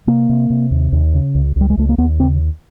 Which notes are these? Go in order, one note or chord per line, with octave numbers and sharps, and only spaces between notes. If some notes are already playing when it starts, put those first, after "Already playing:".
C3 A#3
C3
C3
D#2
D#2
C#3
C#2
C#2 G3
G#3
C#2 A3
A#3
D#2 B3
C#3 C4